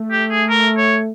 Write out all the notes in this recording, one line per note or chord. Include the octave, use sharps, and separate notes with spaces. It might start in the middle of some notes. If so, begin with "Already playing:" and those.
Already playing: A3
G4
G#4
A#4
C#5